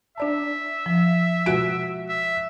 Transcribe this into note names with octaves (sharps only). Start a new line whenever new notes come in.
D4 D5 E5 A5
F3
B2 G#3 F#4 D7
E5